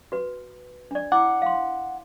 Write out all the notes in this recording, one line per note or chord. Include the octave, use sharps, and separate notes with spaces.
F#4 B4
D4 D5
E4 F#5 D6
F5 C6